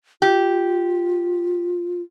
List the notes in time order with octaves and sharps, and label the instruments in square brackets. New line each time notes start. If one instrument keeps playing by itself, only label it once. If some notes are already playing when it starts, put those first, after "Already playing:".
[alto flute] F4 [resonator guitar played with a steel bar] G4